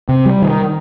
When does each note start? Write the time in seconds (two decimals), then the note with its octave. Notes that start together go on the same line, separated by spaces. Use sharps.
0.09 C3
0.26 G3
0.42 D#3